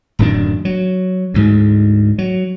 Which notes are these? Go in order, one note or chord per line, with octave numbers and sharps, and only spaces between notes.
D1 F#2 D#3 D4
F#3
D2 G#2
F#3